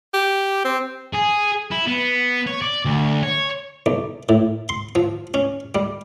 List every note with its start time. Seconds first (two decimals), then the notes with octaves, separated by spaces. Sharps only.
0.14 G4
0.65 C4
1.13 G#4
1.71 E4
1.87 B3
2.47 C#5
2.62 D5
2.85 D2
3.23 C#5
3.86 B1
4.29 A2
4.69 C6
4.95 F3
5.34 C#4
5.75 G3